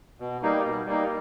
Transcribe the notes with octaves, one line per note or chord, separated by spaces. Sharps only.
B2
G3 A#3 D#4
B2
G3 A#3 D#4